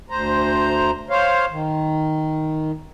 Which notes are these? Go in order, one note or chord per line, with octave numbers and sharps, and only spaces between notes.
D2 C5 A#5
C5 C#5 F5
D#3